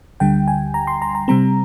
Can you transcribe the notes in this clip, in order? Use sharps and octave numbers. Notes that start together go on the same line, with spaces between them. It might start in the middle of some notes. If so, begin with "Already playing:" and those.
D2 D3 G3 G5
G#5
A#5
C6
A#5
A#5
C3 G3 C4 A#5